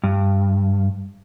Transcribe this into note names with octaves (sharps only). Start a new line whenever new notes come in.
G2